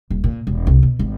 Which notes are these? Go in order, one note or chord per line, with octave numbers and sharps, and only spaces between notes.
D#1
A#2
E1
C2
B2
G#1